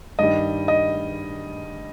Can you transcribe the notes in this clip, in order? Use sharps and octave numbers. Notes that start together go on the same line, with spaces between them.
G2 D#3 G3 D#5
D#5